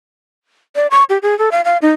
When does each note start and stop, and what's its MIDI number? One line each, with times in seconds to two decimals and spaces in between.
0.76 0.87 74
0.91 1.03 85
1.09 1.18 67
1.22 1.37 68
1.39 1.49 69
1.51 1.61 77
1.64 1.77 77
1.82 1.91 63